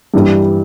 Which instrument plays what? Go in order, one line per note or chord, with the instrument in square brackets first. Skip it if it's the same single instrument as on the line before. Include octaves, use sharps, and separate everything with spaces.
[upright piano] G2 E3 G3